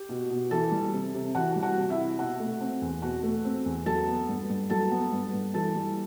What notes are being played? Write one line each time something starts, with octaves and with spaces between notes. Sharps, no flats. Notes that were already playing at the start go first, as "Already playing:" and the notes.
Already playing: G4
B2
B2
E3 A4 A5
G3
C3
C3
E3 F#4 F#5
G3
F#4 F#5
C3
E4 E5
C3
B2 F#4 F#5
A3
C4
E2
B2 F#4 F#5
A3
C4
E2
F#3 A4 A5
B3
G2
G2
F#3 A4 A5
B3
G2
G2
E3 A4 A5
G3